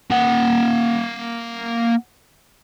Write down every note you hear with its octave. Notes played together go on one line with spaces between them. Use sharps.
A#3 F#5